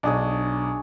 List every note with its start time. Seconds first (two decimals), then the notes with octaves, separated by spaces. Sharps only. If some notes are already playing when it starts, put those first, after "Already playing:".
0.03 B1 D4 G#4 C#5